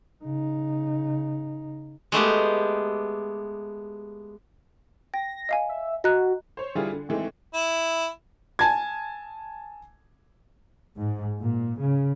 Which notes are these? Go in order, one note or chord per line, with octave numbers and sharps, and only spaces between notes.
C#3 D#4
G#3 A3 B3 G4
G5 A#6
D#5 F5 G#5
E5
F#4 D#5 A#5 F#6
C5 C#5
D3 E3 G3 F4 G#4
D3
D#3 E3 G#3 A3 C4
E4
G#5 A5 G#6
G#2
A#2
C#3